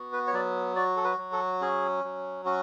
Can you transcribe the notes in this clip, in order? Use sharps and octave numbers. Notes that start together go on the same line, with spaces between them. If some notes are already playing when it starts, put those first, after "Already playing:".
Already playing: B3 F#4
B4
C#5
F#3 D5
F#4 D5
A4
B4
F#3
A4
C#4 G#4
F#3
C#4 F#4